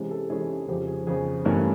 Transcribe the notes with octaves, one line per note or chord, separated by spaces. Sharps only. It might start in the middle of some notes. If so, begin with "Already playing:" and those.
Already playing: C3 E3 G#3 C#4
A4
C3 E3 G#3 C#4 G#4
F2 C#3 F3 G4
G#4
F2 C#3 F3 G#4
G2 E3 A3 C#4 A#4